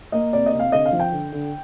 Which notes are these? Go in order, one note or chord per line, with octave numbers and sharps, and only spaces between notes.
A#3 D#5
C3 D5
D#5
C3
F5
D3 D#5
F5
F3
G5
D3
D3